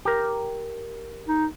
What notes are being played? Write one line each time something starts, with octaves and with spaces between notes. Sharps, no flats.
G4 A#4
D#4